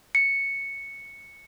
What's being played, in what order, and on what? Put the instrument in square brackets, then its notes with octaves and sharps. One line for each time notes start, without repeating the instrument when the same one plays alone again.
[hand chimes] C#7